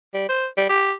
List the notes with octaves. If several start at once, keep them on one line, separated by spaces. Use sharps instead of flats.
G3
C5
G3
G4